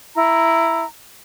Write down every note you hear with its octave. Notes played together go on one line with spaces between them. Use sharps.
E4 A#5